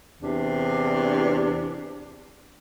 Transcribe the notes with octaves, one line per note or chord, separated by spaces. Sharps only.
E2 C3 D4